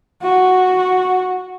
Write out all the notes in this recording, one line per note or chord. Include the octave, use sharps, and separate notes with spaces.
F#4